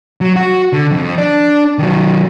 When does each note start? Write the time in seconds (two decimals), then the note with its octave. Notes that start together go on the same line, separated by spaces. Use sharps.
0.21 F#3
0.36 F#4
0.73 D3
0.91 F2
1.18 D4
1.79 D#3 F#3